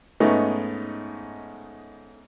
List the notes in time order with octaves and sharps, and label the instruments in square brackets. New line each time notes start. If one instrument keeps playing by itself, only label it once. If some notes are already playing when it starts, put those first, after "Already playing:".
[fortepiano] G#2 A3 B3 C#4 D#4